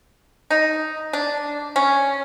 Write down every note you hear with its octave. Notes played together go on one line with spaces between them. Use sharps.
D#4
D4
C#4